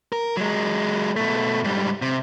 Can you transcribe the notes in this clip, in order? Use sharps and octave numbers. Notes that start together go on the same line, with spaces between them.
A#4
F#3 G#3
B2 A3
G#2 G3
C3